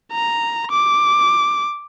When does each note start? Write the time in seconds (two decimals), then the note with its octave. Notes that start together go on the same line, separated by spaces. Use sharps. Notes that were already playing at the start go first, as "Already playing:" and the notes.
0.12 A#5
0.72 D6